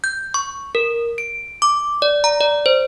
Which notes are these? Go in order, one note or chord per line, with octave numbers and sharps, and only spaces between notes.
G6
C#6
A#4
D7
D6
D5
A#5
D5
C5